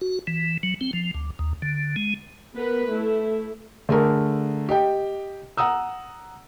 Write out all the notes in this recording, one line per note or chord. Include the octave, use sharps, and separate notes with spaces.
F#4
E3
F#3
C4
F3
D2
D#2
D3
G#3
B3 A#4 B4
A3 E4
D3 A3 G#4 A#4
G4 D#5 G5
F#5 A#5 D#6 E6